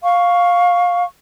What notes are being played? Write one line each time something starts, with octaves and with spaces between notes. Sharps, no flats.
F5 C#6